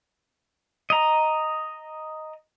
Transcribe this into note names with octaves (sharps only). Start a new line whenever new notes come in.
D#5 A#5